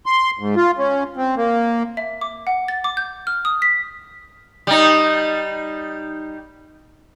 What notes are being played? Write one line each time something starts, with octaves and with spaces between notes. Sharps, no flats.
C6
G#2
F4
C#4
C4
A#3
E5
D6
F#5
A6
D6
G6
F6
D#6
B6
G3 D#4